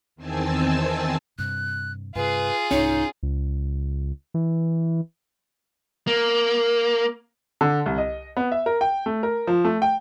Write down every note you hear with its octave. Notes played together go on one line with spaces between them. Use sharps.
E2 D#3 C4 G#5 A5 E6
G2 C3 F#6
G2 C3 F4 G#4 B4
C2 G#2 C#4 D#4
C#2
E3
A#3
D3
C2
D#5
B3
E5
A#4
G5
A3
A#4
F3
A3
G5